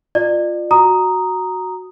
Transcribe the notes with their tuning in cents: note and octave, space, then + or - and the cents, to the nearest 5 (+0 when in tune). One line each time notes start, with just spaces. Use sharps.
F4 +0 D5 +35
F#4 +0 A#5 +0 D#6 +0